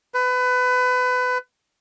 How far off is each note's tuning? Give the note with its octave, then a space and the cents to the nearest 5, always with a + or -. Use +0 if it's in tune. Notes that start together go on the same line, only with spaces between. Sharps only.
B4 +25